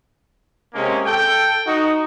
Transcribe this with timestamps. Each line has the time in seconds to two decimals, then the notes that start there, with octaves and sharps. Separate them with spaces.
0.74 C3 G#3 A#3 C#4
1.06 A4 G5
1.67 D#4 F#4